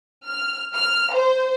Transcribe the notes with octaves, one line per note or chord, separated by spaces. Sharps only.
F6
F6
C5